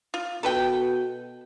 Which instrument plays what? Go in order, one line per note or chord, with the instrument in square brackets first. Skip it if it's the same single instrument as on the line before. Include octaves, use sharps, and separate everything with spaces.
[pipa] F4
[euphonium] B2 [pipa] A4 B4 G5